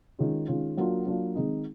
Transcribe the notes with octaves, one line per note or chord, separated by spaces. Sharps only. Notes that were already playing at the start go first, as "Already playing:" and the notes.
D#3 G#3 C#4 F4
D#3 G#3 C#4 F4
F#3 A#3 D4 F4
F#3 A#3 D4 F4
D#3 G#3 C4 D#4